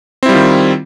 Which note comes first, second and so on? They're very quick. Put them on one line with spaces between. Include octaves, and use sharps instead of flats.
C4 E4 G3 F4 D#3